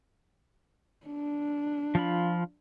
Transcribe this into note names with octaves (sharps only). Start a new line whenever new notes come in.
D4
F3 F4 B5